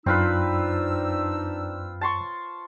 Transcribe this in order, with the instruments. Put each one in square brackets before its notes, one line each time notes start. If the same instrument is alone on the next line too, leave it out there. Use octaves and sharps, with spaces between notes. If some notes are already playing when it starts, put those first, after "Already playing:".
[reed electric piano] F#2 [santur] C4 F4 B4 [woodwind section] D4 D#4 E6
[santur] A5 C6 C#6